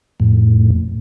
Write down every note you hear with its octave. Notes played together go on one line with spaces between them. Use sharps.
F2 A2